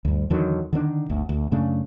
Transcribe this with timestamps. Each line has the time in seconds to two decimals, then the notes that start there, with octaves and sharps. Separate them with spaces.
0.05 D2 G2
0.30 E2 D3 D#3 F#3
0.73 D3 D#3 B3 D4
1.09 G1 D2
1.29 D2
1.51 F#2 C#3 A3 D4